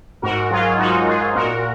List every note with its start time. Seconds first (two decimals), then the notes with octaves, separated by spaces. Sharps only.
0.22 G#2 F#4 A#4
0.50 F#3 F4 G#4
0.79 G#2 D#4 F#4
0.96 F#4
1.07 F#3 F4 G#4
1.35 A#2 F#4 A#4